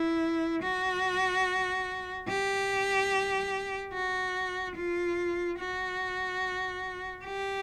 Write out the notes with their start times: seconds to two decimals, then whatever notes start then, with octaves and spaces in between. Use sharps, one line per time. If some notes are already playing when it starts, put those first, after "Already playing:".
Already playing: E4
0.63 F#4
2.28 G4
3.93 F#4
4.76 F4
5.59 F#4
7.24 G4